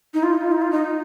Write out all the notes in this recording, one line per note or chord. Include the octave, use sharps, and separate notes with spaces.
D#4
F4
D#4
F4
D#4
F4
D#4